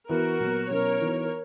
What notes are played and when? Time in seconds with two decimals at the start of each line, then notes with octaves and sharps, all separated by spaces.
0.09 E3 B3 E4 F#4 A#4 B4
0.40 A#2 F#3 B3
0.70 B2 F#3 C#4 E4 A#4 C#5
1.01 E3 B3 D#4 F#4